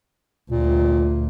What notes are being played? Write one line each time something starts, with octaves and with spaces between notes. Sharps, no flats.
D2 A#2